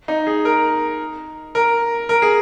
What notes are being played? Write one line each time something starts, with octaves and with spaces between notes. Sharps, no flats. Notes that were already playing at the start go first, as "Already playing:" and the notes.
D#4
G#4
A#4
A#4
A#4
G#4